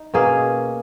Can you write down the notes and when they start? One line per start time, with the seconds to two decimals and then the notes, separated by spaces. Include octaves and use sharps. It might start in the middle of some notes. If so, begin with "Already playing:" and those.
Already playing: D#4
0.14 B2 A#3 C#4 G#4